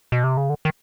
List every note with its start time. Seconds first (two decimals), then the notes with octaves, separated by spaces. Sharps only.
0.12 B2
0.24 C3
0.37 C#3
0.50 D3
0.65 D#3